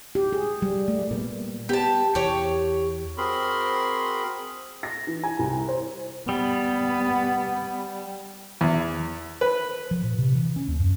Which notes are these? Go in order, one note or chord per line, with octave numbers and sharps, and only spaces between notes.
G4
G#4
G3
A3
A#2 G3 B3
B3 G4 A5
E2 G4 C#5
C4 F#4 G#4 A#4 B5 C6
A#6
E3
G#5
C2
C5
G3 B3
E2
B4
F3
A#2
C3
E3
C#4
D#2
F#2